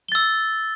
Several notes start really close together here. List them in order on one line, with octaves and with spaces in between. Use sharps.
G7 A6 E6